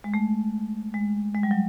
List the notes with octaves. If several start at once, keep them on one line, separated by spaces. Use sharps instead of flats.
G#3
A3
G#3
G#3
G3
F#3